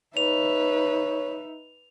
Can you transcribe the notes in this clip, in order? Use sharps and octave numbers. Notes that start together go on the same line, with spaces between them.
D#4 B4 C#5 E5 F7